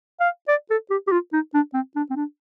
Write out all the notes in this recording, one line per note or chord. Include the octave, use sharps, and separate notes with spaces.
F5
D5
A4
G4
G4
F4
D#4
D4
C4
D4
C4
D4